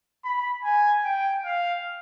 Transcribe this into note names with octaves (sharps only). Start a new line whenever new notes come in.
B5
G#5
G5
F5